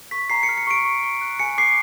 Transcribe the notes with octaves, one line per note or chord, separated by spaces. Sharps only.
C#6 B6
A#5 C7
C#7
F6
C#7
C#6 D7
C#6
C#6
F#6
G#5 C#7
D6 C7